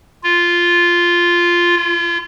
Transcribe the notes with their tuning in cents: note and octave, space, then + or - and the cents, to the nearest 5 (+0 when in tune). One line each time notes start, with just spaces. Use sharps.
F4 -5
F4 -35